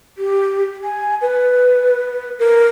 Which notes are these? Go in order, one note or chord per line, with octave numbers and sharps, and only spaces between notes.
G4
G#5
B4
A#4